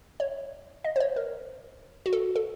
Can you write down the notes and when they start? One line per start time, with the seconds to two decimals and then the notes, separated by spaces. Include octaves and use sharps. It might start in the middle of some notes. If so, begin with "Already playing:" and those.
0.20 C#5
0.84 D#5
0.96 C5
1.00 C#5
1.16 A#4
2.06 F#4
2.13 A4
2.36 A4